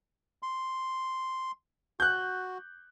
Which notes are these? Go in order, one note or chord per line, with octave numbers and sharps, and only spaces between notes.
C6
F#4 F#6 G6